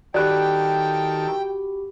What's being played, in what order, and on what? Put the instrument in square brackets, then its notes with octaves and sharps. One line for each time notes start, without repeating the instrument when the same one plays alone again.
[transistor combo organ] D#3 A4 [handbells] F#4 G4 B5 [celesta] D5 F#6 [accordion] G5